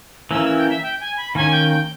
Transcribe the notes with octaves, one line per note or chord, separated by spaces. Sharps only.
E3 A#3 C#4 E6
E6
G5
E5
G5
G#5
B5
D#3 A#3 C#4 G#5
G5
G5